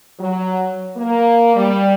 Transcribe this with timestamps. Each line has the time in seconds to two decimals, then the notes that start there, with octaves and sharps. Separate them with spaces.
0.19 F#3
0.96 A#3
1.56 G3